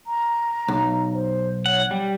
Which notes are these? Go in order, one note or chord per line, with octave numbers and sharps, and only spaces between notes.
A#5
B1
C5
C#5 F#5
G3 G5